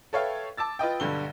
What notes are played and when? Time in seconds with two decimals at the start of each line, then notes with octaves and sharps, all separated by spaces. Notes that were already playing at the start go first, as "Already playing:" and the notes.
0.13 A4 B4 C#5 E5 F5 G5
0.57 A5 D6 E6 A6
0.79 F4 B4 D#5 G5
1.00 B1 G2 D3 G7